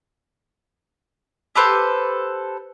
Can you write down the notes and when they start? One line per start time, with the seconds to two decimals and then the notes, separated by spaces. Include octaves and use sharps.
1.55 G4 A4 B4 C5